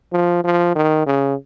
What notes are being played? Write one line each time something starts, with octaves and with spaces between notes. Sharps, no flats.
F3
F3
D#3
C#3